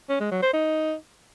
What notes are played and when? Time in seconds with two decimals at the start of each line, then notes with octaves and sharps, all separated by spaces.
0.09 C#4
0.20 G#3
0.31 F#3
0.42 C5
0.53 D#4